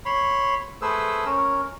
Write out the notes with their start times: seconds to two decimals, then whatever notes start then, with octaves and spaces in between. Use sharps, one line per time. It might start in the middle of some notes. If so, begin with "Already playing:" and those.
0.06 C#5 B5 C6
0.82 A3 G#4 B4 C5 E6
1.26 C#4 A#4